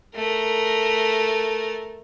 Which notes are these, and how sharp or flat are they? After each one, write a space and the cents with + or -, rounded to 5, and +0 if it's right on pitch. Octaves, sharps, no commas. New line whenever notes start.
A3 +0 A#4 +0